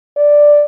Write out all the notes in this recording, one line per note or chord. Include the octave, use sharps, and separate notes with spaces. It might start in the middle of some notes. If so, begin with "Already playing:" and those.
D5